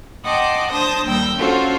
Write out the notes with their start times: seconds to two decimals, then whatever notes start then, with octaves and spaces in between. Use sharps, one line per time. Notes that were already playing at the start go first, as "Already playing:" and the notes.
0.25 D#5 F#5 G5 A5 C6 D6
0.72 D4 C5 A5 D#6 G6 A#6
1.07 D#2 G3 G5 E6 G6 A#6
1.37 C#4 D4 F4 F#4 A4 C5